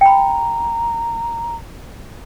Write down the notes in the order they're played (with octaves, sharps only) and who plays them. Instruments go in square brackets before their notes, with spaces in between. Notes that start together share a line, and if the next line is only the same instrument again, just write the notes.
[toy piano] G5 B5 [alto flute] A#5